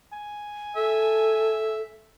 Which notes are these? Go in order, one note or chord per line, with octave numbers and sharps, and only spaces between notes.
G#5
A4 E5